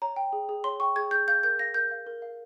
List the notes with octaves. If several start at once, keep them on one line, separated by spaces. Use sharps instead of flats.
C#5 A#5
G5
G#4
G#4
C#5 C6
G5 C#6
G#4 G#6
G#4 G6
F5 G6
A#4 G6
F5 A#6
A#4 G6
F5
A#4
F5